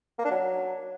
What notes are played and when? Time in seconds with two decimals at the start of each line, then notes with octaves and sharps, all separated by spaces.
0.19 A#3
0.25 D4
0.31 F#3